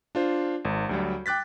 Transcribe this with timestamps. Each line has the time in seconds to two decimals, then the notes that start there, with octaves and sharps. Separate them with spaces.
0.15 D4 F4 C5
0.65 G#1
0.89 D2 F#3 G3
1.26 G5 D6 F#6 A6 B6